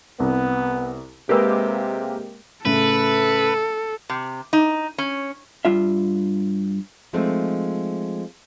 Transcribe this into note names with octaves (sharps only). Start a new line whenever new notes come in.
C2 B3
C3 G#3 A#3 G4 A#4 B4 E6
A2 C#3 A4 B4
C3
D#4
C#4
G2 F4 E5
F3 G#3 A3 C4 D#4